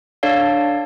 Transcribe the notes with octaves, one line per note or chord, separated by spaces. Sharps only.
D4 A4 C#5 D5 F5